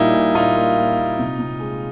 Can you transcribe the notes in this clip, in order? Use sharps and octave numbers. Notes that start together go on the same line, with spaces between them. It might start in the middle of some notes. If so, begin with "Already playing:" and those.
Already playing: A#2 G3 A#3 D#4 E4
A#2
A#2 D#4 F4
A#3
A#2
A#2
C3
C3
G#3